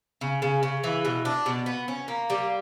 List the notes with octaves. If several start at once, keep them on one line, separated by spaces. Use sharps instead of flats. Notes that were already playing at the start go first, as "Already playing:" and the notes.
C#3
C#3
C#3
E3
B2
D4
B2
B3
C#4
A#3
G3